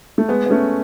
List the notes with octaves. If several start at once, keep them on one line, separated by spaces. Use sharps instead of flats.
A3
G#3 B3
B3
A3 C#4